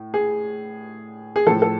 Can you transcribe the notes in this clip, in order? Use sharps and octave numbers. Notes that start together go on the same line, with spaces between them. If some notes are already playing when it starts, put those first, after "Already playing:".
Already playing: A2
G#4
G#4
A2 F3 A4
A4